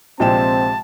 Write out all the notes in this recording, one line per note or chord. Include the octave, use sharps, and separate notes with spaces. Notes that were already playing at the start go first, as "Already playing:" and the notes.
A#1 C3 F3 G#3 C4 G5 A5 E7